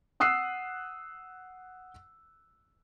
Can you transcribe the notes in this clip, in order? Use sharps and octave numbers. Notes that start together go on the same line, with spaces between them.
F#5 D#6 E6 F#6 C7